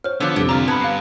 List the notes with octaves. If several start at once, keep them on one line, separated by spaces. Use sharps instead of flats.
C5 C#5 F6
D3 F3 B3 E6 F#6
C2 F2 D3 A4
D4 F4 A#5 D6 F6
G2 B3 A5 B5 G#6
F5 C7